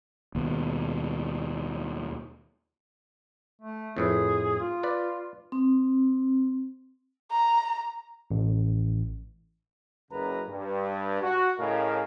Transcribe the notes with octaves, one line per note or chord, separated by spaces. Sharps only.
D#2 B2
A3
F2 A2 G#4 B4
F4
B4 D5
C4
A#5
A1
F#1 F#2 C#3 B4 A#5
G2
F#4
A2 C#3 A#4 D#5 F5 G#5